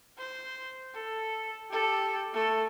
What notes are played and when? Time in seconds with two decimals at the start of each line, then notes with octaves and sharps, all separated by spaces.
0.18 C5
0.94 A4
1.70 G4 A4
2.33 A3 A4